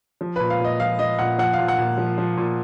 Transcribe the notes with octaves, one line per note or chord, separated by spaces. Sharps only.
F3
A#2 B4
F5
A#2 D#5
F3 F5
F3 D#5
A#2 F#5
F3 F#5
F5
A#2
F#5
A#2
F3
F3
A#2